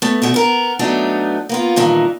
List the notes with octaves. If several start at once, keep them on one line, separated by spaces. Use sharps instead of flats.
A3 B3
D2 B2 A3 E5
B3 A#4
F#3 A3 B3 D4 D#4
A#3 B3 F4
G2 A#2 D#3 E3